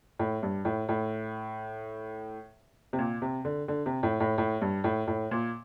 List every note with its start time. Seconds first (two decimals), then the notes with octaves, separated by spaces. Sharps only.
0.19 A2
0.43 G2
0.65 A2
0.89 A2
2.93 C3
2.99 A#2
3.22 C3
3.45 D3
3.68 D3
3.86 C3
4.03 A2
4.20 A2
4.38 A2
4.61 G2
4.84 A2
5.07 A2
5.31 A#2